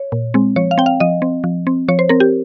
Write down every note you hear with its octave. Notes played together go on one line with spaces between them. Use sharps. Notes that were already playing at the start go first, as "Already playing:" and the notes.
Already playing: C#5
A#2
G#3 C4
F3 C#5
F5
C4 G5
F5
F3 D#5
C4
F3
C4
F3 C#5
C5
C4 A#4
G4